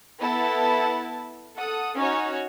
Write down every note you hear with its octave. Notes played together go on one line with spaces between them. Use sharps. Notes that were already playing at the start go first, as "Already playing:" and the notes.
B3 E4 A4 A5
A4 F#5 D#6
C#4 D#4 F#4 C#5